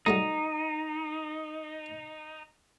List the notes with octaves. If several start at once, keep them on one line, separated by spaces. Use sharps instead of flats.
F#3 G3 A3 D#4